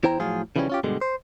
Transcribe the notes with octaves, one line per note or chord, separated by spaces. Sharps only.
E2 E4 C5 G5 A#5
A2 F3 F#3 F4 G#4
C#3 E3 F3 G3 B3 C#4
C#4 F4 G4
G2 B2 D3 G3 G#3
C5